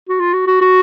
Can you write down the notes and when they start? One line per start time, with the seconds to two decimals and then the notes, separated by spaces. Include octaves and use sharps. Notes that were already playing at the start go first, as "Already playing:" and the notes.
0.09 F#4
0.20 F4
0.33 F#4
0.47 F#4
0.62 F#4